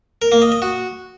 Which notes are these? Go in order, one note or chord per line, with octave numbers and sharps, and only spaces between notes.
A#4
A#3
D#5
D#5
F#4